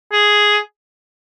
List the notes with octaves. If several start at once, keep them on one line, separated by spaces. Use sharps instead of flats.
G#4